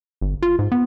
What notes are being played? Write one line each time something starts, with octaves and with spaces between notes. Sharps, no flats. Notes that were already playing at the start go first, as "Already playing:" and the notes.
G1
F4
G#2
B3